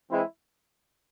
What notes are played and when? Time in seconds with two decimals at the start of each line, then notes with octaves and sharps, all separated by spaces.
0.10 E3 G#3 C4 E4